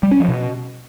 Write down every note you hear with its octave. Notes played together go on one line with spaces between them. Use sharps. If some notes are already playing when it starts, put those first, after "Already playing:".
G3
C#4
F3
B2